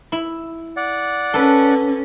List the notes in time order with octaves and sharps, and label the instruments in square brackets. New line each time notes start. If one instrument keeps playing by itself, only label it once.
[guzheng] E4
[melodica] D5 F#5
[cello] C#4 [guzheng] A4 B4